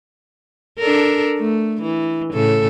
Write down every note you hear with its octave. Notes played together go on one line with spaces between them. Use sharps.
D4 A4 A#4
A3
E3
A2 C#3 A4